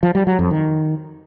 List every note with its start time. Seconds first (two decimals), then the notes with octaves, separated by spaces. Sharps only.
0.03 F3
0.15 G3
0.27 F#3
0.39 F2
0.51 D#3